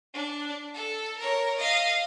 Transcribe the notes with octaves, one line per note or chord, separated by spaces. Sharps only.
D4
A4
A#4 C#5
D#5 F5